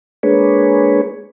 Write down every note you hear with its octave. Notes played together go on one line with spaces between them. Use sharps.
G#3 A#3 D4 G#4 B4 C#5